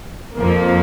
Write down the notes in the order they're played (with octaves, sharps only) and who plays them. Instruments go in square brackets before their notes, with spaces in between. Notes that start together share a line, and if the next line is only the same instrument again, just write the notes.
[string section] F2 F3 A#3